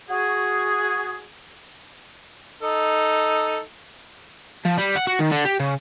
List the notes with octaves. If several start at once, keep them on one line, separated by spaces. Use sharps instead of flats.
F#4 G#4
D#4 A4
F3
G3
F#5
F#4
D#3
D3
G4
C#3